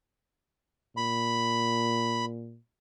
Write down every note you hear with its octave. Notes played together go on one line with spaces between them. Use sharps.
A#2 B5